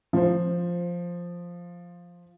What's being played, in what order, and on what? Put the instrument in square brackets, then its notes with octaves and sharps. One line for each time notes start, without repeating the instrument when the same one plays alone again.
[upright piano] F3 C5